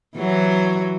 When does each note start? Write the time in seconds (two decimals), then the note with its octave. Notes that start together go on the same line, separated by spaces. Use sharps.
0.16 E3 F#3 F#4